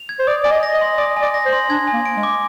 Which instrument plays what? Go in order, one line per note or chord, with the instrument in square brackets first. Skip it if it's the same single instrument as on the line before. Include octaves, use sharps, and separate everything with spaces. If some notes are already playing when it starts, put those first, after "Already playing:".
Already playing: [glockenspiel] F7
G#6
[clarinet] C5
[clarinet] D5 [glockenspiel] D#6
[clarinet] D5 [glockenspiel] G#5
[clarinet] D#5
[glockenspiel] A#6
[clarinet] D#5
[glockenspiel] C6
[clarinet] D5 [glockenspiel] D#6
[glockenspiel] G#5
[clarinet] D5
[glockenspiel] A#6
[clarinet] C5
[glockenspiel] C6
[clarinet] D4 [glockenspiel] G#6
[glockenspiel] G#5
[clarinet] A#3
[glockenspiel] D7
[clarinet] G#3
[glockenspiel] D6